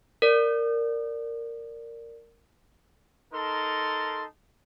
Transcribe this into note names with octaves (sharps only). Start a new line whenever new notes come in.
A#4 D5
D#4 A4 A#4 A5 C6